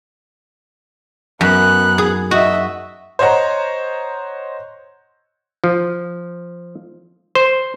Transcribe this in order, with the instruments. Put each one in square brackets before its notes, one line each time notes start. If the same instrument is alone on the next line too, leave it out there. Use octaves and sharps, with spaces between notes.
[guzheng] F#2 [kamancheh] B3 F#6
[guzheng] G#4
[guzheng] F#4 [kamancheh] D#5 E5
[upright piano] C5 C#5 D#5 F#5 A#5
[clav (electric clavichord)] F3
C5